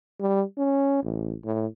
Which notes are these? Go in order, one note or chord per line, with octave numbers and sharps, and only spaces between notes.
G3
C#4
A1
A2